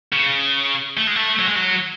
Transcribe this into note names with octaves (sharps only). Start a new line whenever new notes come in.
C#3
A3
G#3
A3
F#3
G#3
F#3